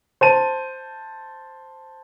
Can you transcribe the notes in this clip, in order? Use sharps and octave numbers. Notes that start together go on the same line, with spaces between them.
C5 A5 D#7